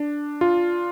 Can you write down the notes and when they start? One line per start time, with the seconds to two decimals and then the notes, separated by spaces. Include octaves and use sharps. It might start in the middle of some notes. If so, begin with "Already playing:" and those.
Already playing: D4
0.41 F4